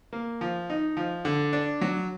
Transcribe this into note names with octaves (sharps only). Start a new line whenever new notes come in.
A#3
F3
D#4
F3
D3
D4
F#3